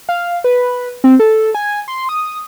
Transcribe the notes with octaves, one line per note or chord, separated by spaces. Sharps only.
F5
B4
C4
A4
G#5
C6
D#6